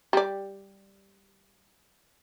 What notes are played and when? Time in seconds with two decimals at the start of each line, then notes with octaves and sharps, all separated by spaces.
0.13 G3 D5